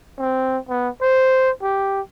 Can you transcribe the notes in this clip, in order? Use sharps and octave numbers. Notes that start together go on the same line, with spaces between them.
C4
B3
C5
G4